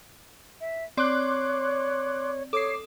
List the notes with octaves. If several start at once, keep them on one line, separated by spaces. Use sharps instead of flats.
E5
C4 C#5 D5 C6 D6 F#6
A4 C#5 D6 D#6 C7